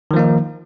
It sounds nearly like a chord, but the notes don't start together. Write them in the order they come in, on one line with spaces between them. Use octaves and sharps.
D#3 F3 A#3 D#4